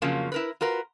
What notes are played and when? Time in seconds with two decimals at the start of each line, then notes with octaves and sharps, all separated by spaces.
0.02 F2 C#3 F3 F#3 A#3
0.32 E4 A#4 B4
0.61 F4 F#4 A#4 B4